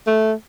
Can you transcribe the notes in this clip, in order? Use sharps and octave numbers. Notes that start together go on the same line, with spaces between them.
A3